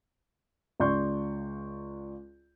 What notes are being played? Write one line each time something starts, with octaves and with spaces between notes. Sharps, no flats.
C#2 C#3 D5 C6 C#6 G6